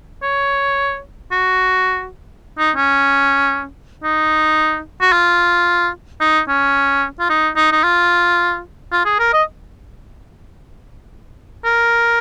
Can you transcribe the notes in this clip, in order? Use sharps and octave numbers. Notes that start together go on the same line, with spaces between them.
C#5
F#4
D#4
C#4
D#4
F#4
F4
D#4
C#4
F4
D#4
D#4
D#4
F4
F4
G#4
A#4
D#5
A#4